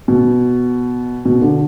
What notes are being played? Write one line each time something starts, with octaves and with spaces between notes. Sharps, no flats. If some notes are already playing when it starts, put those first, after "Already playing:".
B2
B2
D3